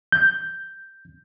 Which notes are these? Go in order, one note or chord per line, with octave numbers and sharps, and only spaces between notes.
G6